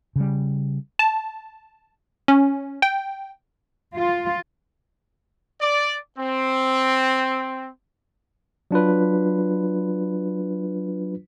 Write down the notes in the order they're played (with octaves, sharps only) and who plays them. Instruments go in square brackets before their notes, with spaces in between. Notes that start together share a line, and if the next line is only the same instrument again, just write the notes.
[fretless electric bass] C#3 G3
[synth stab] A5
C#4
G5
[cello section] F4
[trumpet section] D5
C4
[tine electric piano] F#3 D4 F4 B4